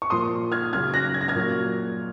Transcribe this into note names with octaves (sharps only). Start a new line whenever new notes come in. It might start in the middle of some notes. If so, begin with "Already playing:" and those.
C#6
A#2 F3 C6 D#6
F6 G#6
C#3 F#3 F6 G#6
F#6 A#6
G#6
A#6
F6 G#6
A#2 F#3